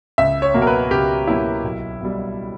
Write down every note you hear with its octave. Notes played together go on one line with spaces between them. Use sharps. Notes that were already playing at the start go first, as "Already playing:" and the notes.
C#2 E5
C#5
B2 F#3 A#3
A#4
B4
C#2 G4
B2 F#3 A#3 E4
B1
B2 G3